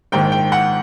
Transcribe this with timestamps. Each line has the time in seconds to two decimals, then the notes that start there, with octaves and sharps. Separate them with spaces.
0.12 A#1 G#2 D#3 G5
0.32 G5
0.52 F#5